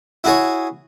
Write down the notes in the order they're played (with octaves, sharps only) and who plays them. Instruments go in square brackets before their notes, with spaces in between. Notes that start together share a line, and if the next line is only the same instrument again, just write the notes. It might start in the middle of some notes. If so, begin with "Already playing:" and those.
[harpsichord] E4 F#4 G#4 C#5